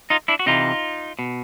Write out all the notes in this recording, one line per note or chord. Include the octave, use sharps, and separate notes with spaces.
D#4 F4
D4 E4
F#4
C3 E3 D#4 F4
B2